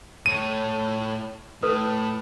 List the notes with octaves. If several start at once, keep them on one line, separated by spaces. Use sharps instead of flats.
A2 C#5 D#7
A2 A4 B4 D#6